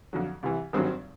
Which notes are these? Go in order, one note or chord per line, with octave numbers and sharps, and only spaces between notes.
F2 D3 F#3
C2 C3 E3
G#1 G2 D#3 F#3 C4